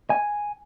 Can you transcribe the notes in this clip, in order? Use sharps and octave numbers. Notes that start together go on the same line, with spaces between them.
G#5